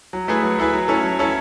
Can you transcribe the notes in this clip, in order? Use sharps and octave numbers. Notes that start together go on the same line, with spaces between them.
F#3
A3 E4 G#4 B4
F#3
A3 E4 G#4 B4
F#3
C#4 E4 A4
F#3
C#4 E4 A4